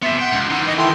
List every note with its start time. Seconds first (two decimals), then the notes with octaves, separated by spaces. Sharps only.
0.02 B3 G4 E5 C6
0.19 F#5 G5
0.33 C#2
0.50 D#3 E3 F#5
0.66 D#5
0.78 E4 A4 G5 C6